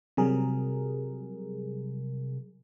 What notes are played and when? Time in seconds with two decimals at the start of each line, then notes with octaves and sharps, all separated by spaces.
0.17 C3 F#3 G3 G#4 A#4